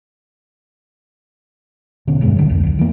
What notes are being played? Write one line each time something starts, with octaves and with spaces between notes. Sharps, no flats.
E1 B2 D3 C#4
E1 G2 G#3
B1 D3 F#3
C2 F2 D3
D#2
E3 A#3